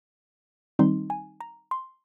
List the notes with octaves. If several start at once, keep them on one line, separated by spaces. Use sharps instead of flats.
D#3 G3 C4 D#4 C6
G#5
A#5
C6